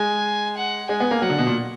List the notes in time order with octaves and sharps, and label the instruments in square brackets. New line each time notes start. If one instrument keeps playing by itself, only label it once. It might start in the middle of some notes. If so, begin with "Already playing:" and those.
Already playing: [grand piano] G#3 [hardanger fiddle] G#5
[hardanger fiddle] F#5
[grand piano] G#3 [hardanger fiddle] G#5
[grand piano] B3
A#3
[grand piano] F#3 [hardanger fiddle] F#5
[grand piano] D3
B2
A#2